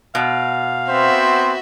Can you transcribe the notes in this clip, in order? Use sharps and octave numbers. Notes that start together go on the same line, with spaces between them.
B2 F5
B3 C4 F#4 C5 E5